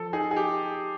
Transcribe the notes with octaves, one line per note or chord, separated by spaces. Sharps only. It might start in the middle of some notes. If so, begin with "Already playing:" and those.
Already playing: F3 A4
D#4 G#4
G#4
G4